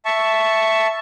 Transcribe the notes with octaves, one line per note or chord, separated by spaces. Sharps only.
E5 A5 C#6